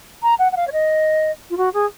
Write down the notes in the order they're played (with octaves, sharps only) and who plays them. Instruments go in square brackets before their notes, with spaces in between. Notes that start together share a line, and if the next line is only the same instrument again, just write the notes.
[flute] A#5
F#5
F#5
F5
C#5
D#5
F4
F#4
G#4